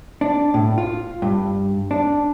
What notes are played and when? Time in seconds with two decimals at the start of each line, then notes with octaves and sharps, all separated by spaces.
0.21 D4
0.54 A2
0.78 F4
1.22 G2
1.91 D4